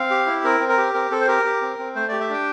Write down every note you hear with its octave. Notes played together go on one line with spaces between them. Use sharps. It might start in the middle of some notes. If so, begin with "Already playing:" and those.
Already playing: C4 F5
G4
E4
C4 A#4
C4
A#4
G4
C4 A#4
C4 A4
C5
G4 A#4
G4
C4
C4
A3 C5
G4 D5
E5
D4 G5